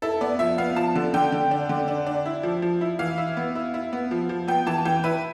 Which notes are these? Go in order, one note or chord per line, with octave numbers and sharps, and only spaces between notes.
E4 A4
B3 D5
F3 E5
B3 F5
F3 A5
D3
D3 G5
D3
D4
D3
D4
D4
E4
F3
F3
E4
E3 F5
E4
B3
E4
E4
B3
F3
F3
B3 G5
E3 A5
E3 G5
E4 B4